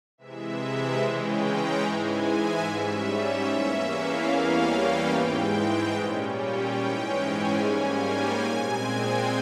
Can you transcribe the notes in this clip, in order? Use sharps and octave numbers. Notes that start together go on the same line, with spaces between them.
C3 E3 G#3 E5
C#3 E3 G#3 C#4 G5
A#5
G#2 E3 G#3 G#5
E5
G#2 G3 C#4 E5
E5
E2 E3 A#3 C#4
F5
E2 E3 G3 A#3 C#4
G5
G#2 E3 G#3 G5
A#2 G3 C#4
G5
G#2 E3 G#3 C#4
G#5
G#2 G3 A#3 C#4 G#5
G5
A#2 G#3 C4 G#5
G5